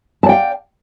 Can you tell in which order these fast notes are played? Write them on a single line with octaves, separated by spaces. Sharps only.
A5 D5 G5 F5